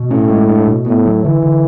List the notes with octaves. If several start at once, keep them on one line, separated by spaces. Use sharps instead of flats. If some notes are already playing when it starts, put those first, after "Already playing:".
Already playing: B2
A2 C#4
G#3
D4
B2
A2 B3
F#3
D3 E3
D3